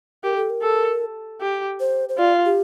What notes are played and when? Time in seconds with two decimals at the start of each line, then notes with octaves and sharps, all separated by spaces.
0.24 G4 A#4
0.36 A4
0.50 A#4
0.62 A4
1.41 G4
1.80 C5
2.09 C5
2.18 F4 D5
2.45 G4